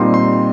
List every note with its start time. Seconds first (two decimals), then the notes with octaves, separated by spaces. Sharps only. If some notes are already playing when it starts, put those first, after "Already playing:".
Already playing: A#2 G3 C4 D#4 C6
0.14 C6